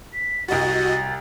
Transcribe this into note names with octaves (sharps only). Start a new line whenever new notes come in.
B6
C2 G3 F#4 D#5 A6